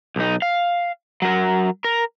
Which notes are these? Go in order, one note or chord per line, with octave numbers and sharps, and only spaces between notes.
B1 D#4
F5
F#3 A#4
A#4